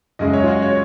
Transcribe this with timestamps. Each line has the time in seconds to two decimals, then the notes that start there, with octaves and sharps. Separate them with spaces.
0.19 F#2 C#3 G#3 D#5
0.33 C#5
0.44 F4
0.48 F#4
0.62 C#5